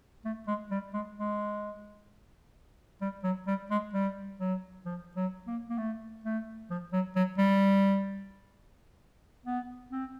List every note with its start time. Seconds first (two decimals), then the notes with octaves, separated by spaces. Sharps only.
0.25 A3
0.47 G#3
0.71 G3
0.94 G#3
1.18 G#3
3.01 G3
3.24 F#3
3.47 G3
3.71 G#3
3.93 G3
4.40 F#3
4.85 F3
5.16 F#3
5.47 A#3
5.70 A#3
5.78 A3
6.24 A3
6.70 F3
6.93 F#3
7.16 F#3
7.38 G3
9.46 B3
9.91 C4